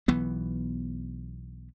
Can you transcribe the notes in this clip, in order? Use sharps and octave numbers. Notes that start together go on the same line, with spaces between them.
B1 E3 B3